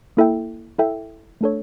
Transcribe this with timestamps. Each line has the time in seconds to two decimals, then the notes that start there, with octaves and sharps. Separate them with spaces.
0.17 A#3 E4 A4 E5 G5
0.79 E4 A4 E5 G5
1.41 A3 D4 A4 C#5